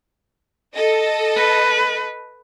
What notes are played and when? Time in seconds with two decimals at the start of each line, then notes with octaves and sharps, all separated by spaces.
0.75 A4 D#5
1.36 B4